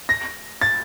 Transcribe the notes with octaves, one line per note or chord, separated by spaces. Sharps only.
A#6
A6